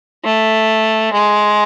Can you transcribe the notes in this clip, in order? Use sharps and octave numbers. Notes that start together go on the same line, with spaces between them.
A3
G#3